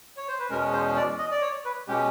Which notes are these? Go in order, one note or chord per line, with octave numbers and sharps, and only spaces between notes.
C#5
C5
B4
E2 B2 G#3 C#4 A#4
C5
D5
D#5
D5
C#5
B4
B2 G#3 C#4 G4